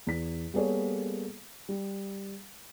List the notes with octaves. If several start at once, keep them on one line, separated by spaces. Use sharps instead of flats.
E2 B6
G3 A#3 B3 G#4 A4 C#5
G3